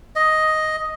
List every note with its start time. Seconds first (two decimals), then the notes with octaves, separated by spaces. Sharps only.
0.16 D#5